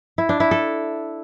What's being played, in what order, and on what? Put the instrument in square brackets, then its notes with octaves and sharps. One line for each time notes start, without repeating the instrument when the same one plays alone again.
[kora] E4
D4
E4
A4